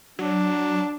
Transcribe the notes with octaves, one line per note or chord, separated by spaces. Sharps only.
F#3 D4